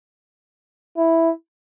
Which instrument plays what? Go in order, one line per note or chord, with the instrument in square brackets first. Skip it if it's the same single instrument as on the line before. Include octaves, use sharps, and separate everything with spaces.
[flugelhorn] E4